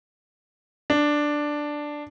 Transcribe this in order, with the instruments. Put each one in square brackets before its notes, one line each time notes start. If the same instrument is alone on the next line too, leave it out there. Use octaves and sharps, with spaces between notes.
[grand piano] D4